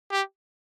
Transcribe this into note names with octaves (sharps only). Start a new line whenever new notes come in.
G4